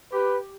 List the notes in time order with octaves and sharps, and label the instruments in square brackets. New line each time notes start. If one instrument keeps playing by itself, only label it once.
[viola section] G4 [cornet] B4